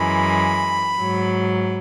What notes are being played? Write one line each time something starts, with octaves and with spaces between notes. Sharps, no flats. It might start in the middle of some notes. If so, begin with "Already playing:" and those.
Already playing: F#2 E3 G#3 B5
G#2 F#3